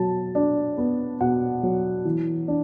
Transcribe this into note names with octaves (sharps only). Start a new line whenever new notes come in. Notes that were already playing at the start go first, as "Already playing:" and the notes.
Already playing: B2 F#3 A5
D4
B3
B2 F#5
F#3
E3
D4